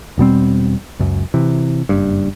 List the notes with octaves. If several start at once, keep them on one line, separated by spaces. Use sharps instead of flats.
E1 B2 G3 C4
C#2 F#2
C3 E3
F#1 G2